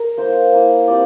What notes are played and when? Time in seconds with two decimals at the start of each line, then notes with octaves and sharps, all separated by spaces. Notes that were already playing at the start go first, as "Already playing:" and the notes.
Already playing: A#4
0.17 A#3 E4 C5
0.53 A#3 E4
0.88 G3 C4 F4 D5